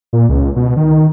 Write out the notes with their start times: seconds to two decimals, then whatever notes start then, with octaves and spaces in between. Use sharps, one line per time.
0.13 A#2
0.29 C#2
0.56 B2
0.77 D#3